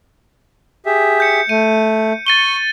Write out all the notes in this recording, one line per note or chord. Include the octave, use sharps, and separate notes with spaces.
G4 G#4 E5
G6 C#7
A3 D#7
C#6 A6 D#7 G7